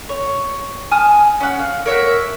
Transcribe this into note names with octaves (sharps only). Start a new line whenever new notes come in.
C#5
G#5 A5 D#6 F6
C#4 F#5
F5
A#4 C#5 E5 F#5